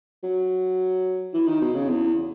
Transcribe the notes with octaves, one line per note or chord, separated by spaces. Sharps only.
F#3
E3
D#3
B2
C#3
E2